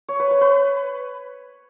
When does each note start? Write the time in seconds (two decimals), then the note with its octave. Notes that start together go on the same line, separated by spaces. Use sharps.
0.09 C#5
0.20 B4
0.31 B4
0.41 B4